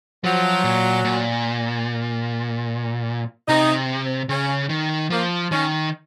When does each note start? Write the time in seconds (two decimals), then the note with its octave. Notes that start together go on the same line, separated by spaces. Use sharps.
0.24 F3 F#3
0.64 A#2
1.04 A#2
3.48 C3 D#4
4.29 C#3 C#4
4.69 D#3
5.10 F3 A#3
5.51 D#3 C#4